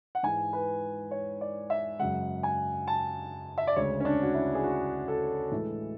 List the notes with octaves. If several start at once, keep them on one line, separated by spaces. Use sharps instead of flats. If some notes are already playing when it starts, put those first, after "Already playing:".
F#5
G#2 E3 G#3 G#5
B4
C#5
D5
E5
F#2 C#3 G#3 F#5
G#5
A5
E5
D5
D2 C#3 G#3 C#5
C#4
D4
F#4
E4
G#4
F#4
A4
A2 E3 G#3